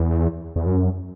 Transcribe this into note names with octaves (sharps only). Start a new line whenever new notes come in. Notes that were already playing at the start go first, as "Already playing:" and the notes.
Already playing: E2
E2
F#2